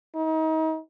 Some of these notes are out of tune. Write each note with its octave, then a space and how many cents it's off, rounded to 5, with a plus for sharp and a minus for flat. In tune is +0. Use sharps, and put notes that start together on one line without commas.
D#4 +35